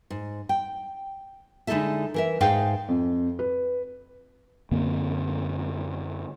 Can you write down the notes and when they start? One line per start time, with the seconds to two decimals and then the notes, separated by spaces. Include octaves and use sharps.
0.10 G#2
0.49 G5
1.67 D3 G#3 D#4 E4 A4 E5
2.14 E3 A#4 E5
2.41 G#2 D#4 G#4 F5 G5
2.88 F2
3.39 B4
4.71 F#2 D3 A#3 C4